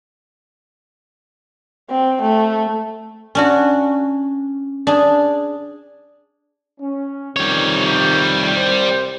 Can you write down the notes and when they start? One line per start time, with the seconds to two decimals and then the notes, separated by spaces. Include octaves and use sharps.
1.90 C4
2.22 A3
3.35 C#4 D4 F#4
4.87 D4 G#4
6.80 C#4
7.36 F2 C3 D#3 G3 C#5
8.56 C2 C5